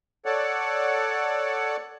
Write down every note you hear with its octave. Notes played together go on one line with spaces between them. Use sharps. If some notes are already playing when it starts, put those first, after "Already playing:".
A4 C#5 D5 F#5